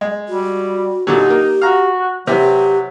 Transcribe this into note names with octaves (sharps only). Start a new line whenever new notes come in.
G#3
G3 F#4
A#2 D3 F#3 D#4 G4
A#3
F#4 F5 A#5
C3 E3 F#3 G4